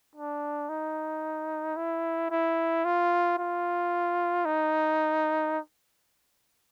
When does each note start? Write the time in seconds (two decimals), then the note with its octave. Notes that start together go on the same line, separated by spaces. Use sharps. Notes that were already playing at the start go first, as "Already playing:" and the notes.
0.15 D4
0.69 D#4
1.77 E4
2.31 E4
2.85 F4
3.38 F4
4.46 D#4